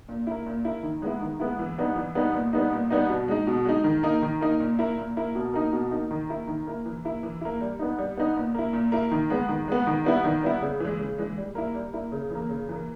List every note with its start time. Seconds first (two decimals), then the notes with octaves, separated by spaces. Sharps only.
0.09 A#2
0.27 A#3 E4
0.46 A#2
0.65 A#3 E4
0.83 D#3
1.02 G#3 B3 E4
1.21 D#3
1.40 G#3 B3 E4
1.59 E3
1.78 G3 B3 D#4
1.96 E3
2.15 G3 B3 D#4
2.34 A#2
2.53 G3 B3 D#4
2.72 A#2
2.90 G3 B3 D#4
3.09 B2
3.28 G#3 D#4
3.47 B2
3.65 G#3 D#4
3.84 D#3
4.03 A#3 D#4
4.22 D#3
4.41 A#3 D#4
4.60 A#2
4.79 A#3 E4
4.97 A#2
5.17 A#3 E4
5.35 B2
5.53 A#3 D#4
5.73 B2
5.91 A#3 D#4
6.11 D#3
6.29 A#3 E4
6.47 D#3
6.67 A#3 E4
6.86 E3
7.05 A#3 E4
7.23 E3
7.41 A#3 E4
7.61 G3
7.79 B3 D#4
7.98 G3
8.18 B3 D#4
8.36 A#2
8.54 A#3 E4
8.73 A#2
8.92 A#3 E4
9.11 D#3
9.30 G#3 B3
9.49 D#3
9.68 G#3 B3
9.87 D#3
10.05 G3 B3 E4
10.24 D#3
10.43 G3 B3 E4
10.62 C#3
10.80 E3 G#3
10.99 C#3
11.18 E3 G#3
11.37 G3
11.55 A#3 E4
11.75 G3
11.93 A#3 E4
12.12 C#3
12.30 E3 A#3
12.49 C#3
12.69 E3 A#3